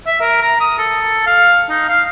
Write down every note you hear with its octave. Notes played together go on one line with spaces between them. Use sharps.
E5
A#4
A#5
D#6
A4
F5
D#4
F5